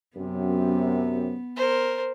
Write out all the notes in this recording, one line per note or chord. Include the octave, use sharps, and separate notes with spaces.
F#2 C3 B3
A#4 C5